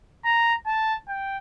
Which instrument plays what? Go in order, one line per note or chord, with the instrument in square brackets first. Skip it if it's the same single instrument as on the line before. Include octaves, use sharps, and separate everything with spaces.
[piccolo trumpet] A#5
A5
G5